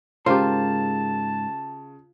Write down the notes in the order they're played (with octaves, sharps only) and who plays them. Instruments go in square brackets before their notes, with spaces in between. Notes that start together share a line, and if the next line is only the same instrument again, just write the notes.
[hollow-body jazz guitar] G#2 A#4 C5 [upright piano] C#3 [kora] F4 G4 [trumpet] A5